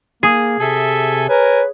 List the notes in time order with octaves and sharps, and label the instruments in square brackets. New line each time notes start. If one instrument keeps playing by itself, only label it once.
[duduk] A#3 [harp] G#4
[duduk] C3 [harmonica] A4 E5 G#5
[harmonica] A#4 G#5 [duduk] B4 [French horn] C#5